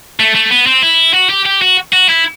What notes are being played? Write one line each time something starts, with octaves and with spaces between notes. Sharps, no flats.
A3
A3
B3
C4
E4
F#4
G4
G4
F#4
F#4
E4